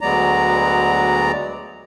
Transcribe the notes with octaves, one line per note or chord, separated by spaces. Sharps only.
D2 F#3 G#3 B3 D5 A#5